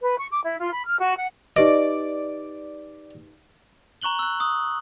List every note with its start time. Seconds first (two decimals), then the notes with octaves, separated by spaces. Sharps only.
0.01 B4
0.18 C#6
0.30 D6
0.44 E4
0.59 F4
0.72 B5
0.86 F6
0.99 F#4
1.16 F#5
1.56 D#4 G4 B4 D5 D#5
4.02 A#5 C#6 F#6 F#7 G7
4.19 E6 F#6
4.40 D#6